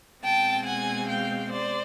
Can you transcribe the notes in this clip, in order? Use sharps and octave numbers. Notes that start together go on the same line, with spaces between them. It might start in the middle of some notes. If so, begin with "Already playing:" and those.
B2 G#3 C4 G5 A5
F#5 G#5
F5 G5
C5 D5